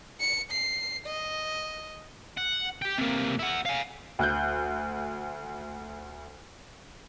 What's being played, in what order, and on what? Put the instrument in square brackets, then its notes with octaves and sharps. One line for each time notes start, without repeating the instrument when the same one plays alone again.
[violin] C#7
C7
D#5
[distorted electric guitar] F#5
G4 G5
C3 A#3
E4 F#5
F5 G#5
[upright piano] D2 F#6 G6